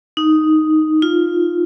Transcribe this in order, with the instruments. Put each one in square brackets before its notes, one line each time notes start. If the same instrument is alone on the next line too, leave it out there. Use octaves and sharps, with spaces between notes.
[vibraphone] D#4
F4